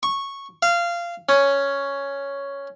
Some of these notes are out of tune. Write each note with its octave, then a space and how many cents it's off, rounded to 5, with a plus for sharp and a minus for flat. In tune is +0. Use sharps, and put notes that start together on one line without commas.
C#6 -10
F5 -20
C#4 +5